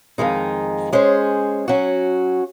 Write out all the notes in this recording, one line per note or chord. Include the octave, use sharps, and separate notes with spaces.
F2 D#3 G#3 D#4
G#3 C#4 G#4 C5
F#3 C#4 F#4